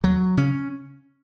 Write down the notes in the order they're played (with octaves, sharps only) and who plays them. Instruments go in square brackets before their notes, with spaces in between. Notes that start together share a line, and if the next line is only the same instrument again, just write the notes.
[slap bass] D#2 F#3
C#3 C#4